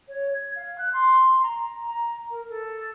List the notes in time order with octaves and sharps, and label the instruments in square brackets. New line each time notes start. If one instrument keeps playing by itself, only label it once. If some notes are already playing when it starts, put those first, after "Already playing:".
[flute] C#5
G#6
F5
F#6
C6
A#5
A#5
A#5
A#4
A4